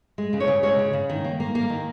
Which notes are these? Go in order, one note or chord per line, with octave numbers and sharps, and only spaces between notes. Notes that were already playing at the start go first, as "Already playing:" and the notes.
G#3
C#3
C#5
C#3
G#3 C#5
C#3
C#3
D#3
A#3
A#3
A#3
D#3